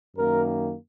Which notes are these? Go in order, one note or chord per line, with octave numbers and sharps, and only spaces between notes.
F#2 D#3 A#3 A#4